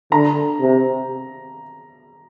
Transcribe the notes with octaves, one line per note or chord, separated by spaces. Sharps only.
D3 A#5
C3